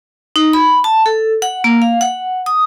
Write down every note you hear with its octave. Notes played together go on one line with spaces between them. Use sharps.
D#4
B5
A5
A4
F#5
A#3
F5
F#5
D#6